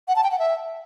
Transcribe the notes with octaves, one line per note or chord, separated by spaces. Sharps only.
F#5
A5
G5
F#5
E5